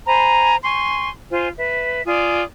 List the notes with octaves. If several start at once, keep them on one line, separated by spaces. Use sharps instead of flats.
C5 G#5 A#5 B5
G#5 C6 C#6
F4 C5 G#5
B4 E5
F4 D5 G#5 D#6